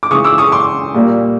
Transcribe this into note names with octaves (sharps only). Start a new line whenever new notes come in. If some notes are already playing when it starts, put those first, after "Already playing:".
D6
C#3 E3 G#3 C#6 D#6
D6 E6
C#6 D#6
C6 D6
A#2 G3 A#3